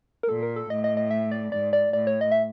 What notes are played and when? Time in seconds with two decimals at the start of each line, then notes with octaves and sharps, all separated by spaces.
0.23 A#4
0.29 A#2 A4
0.43 A#4
0.56 A4
0.70 A2 D#5
0.84 D#5
0.97 D#5
1.11 E5
1.31 D5
1.52 G#2 D5
1.73 D5
1.93 A2 D5
2.07 C#5
2.21 D#5
2.32 E5